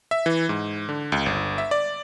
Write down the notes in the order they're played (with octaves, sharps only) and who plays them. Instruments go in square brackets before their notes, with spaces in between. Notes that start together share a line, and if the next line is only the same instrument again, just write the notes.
[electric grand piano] E5
E3
G#2
D3
C#2
G1
E5
D5